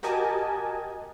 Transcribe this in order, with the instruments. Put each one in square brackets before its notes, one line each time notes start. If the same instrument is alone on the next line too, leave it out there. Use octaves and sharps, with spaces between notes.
[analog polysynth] F#4 G4 A#4 D#5 G#5 A5